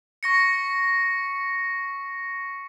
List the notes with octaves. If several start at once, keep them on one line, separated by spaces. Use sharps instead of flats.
C#6 A#6 C#7